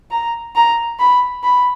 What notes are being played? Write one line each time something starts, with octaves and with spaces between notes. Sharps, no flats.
A#5
A#5
B5
B5